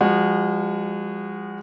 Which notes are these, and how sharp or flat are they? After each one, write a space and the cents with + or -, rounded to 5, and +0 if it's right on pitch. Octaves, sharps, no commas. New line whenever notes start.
F3 +0 G#3 -40 F#4 +0